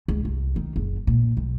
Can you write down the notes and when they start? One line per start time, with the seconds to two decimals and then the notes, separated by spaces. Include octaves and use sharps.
0.08 C#2
0.25 C2
0.56 D#3
0.76 F#1
1.07 A#2
1.37 B1